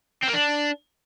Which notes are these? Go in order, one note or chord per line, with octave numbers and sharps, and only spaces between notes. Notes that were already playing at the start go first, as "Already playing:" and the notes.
C4
A#3
D4